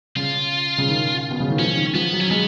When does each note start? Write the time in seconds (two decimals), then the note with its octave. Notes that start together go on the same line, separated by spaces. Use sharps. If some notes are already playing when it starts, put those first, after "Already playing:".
0.16 C#3 F4
0.78 C#3
0.88 D#3
1.31 B2
1.40 C#3
1.50 D#3
1.59 F3 C#4
1.77 D#3
1.95 F3 B3
2.13 F#3
2.20 C#4
2.31 G#3 B3